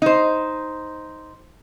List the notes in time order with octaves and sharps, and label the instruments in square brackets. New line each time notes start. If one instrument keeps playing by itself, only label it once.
[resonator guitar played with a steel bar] D#4 C5